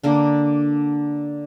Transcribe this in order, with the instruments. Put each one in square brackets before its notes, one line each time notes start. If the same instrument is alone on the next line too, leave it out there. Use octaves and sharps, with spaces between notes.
[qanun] D3 A#3 D4